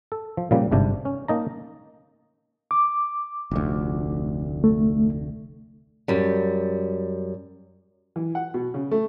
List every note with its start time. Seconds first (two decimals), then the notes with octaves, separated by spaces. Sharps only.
0.12 A4
0.37 F3
0.51 A#2 C#3 F3 G3 A#3
0.71 G1 G#2 C3 D4
1.05 C#4
1.28 A#3 C#4 D#4 A5 A#5
2.71 D6
3.51 F1 D2
4.64 A3
6.08 F#2 G3
8.16 E3
8.35 F#5
8.54 B2
8.74 C#3
8.91 A3